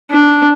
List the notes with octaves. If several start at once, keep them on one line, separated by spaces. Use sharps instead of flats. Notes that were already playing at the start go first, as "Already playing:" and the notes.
D4